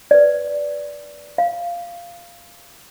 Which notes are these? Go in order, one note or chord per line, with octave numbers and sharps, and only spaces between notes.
B4 D5
F5